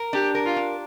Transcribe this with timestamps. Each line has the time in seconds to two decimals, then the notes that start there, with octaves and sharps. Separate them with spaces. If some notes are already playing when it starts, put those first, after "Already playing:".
Already playing: A#4
0.13 D4 G4
0.35 A#4
0.45 F4
0.56 D4